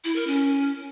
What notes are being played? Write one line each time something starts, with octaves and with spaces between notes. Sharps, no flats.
E4
A#4
C#4